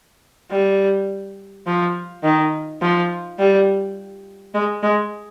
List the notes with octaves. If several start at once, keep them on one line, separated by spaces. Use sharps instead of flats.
G3
F3
D#3
F3
G3
G#3
G#3